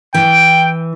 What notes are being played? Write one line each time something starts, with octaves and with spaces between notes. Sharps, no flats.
E3 G5